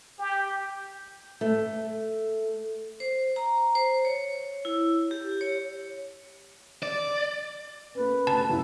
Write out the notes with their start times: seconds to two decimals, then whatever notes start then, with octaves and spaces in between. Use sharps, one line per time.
0.19 G4
1.41 A3
3.00 C5
3.36 A#5
3.75 C5
4.05 C#5
4.65 E4
5.11 G4
5.41 C#5
6.83 D5
7.95 A#3 C#4 B4
8.27 D2 A5
8.50 C2 F#2 A2 E4